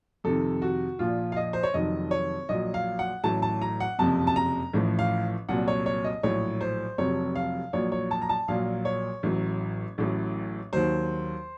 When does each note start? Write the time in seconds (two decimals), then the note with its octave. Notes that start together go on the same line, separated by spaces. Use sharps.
0.24 F2 C3 D#3 A4
0.62 F#4
0.99 A#1 A#2 F3 F4
1.32 F5
1.36 D#5
1.53 C5
1.63 C#5
1.74 F1 F2 D#3 F#3 D#5
2.11 C#5
2.49 A#1 A#2 F#3 D#5
2.74 F5
2.99 F#5
3.24 A1 A2 F#3 A5
3.42 A5
3.62 A#5
3.80 F#5
3.99 F#1 F2 C3 F3 A5
4.27 A5
4.36 A#5
4.73 A1 A2 F3
4.99 F5
5.48 C2 A#2 F#3 F#5
5.68 C#5
5.86 C#5
6.04 D#5
6.23 A#1 A2 F#3 C#5
6.61 C5
6.98 F1 F2 C3 F#3 C#5
7.36 F5
7.73 A#1 A#2 F#3 C#5
7.92 C#5
8.11 A5
8.22 A#5
8.29 A5
8.48 A#1 A#2 F#3 F5
8.85 C#5
9.23 A1 A2 F#3
9.98 A1 A2 F#3
10.73 D#2 D#3 F#3 C5